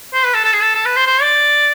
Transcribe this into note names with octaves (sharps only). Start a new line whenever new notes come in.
C5
B4
A4
A4
G#4
A4
A4
B4
C5
C5
D5